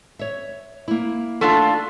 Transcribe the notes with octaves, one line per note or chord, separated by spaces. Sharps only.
C#5 E5
A#3 E4
A3 D4 F4